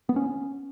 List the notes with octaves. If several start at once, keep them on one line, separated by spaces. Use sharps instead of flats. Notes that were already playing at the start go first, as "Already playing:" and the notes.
B3
C#4